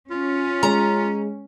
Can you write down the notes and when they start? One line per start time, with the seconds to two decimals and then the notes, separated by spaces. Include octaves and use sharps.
0.11 C#4 F4
0.63 G#3 A#5